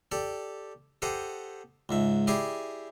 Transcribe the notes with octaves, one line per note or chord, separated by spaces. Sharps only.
G4 A4 D5
G4 A4 C5 D#5 F#5
C#2 G#2 E5
E4 G4 G#4 D5 D#5 C6